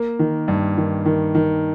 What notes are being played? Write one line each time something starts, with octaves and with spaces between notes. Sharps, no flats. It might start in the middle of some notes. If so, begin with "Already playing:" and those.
Already playing: A#3
D#3
G2
D#3
D#3
D#3